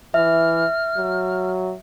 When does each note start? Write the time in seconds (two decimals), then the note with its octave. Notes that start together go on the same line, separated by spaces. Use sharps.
0.14 E3 E5 F6
0.97 F#3